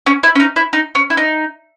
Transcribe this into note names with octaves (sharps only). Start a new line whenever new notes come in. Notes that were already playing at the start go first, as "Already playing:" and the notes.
C#4
E4
C#4
D#4
E4
D#4
C#4
E4
D#4